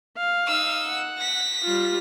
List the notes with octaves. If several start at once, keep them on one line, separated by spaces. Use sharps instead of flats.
F5
D#4 E6
F#5
A#6 B6
G3 F4